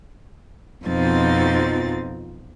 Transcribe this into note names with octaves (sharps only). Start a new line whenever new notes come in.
F2 B2 F3 C4 D#4 A6